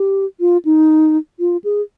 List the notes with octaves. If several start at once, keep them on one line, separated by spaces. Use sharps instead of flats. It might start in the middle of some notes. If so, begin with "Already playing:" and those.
Already playing: G4
F4
D#4
F4
G#4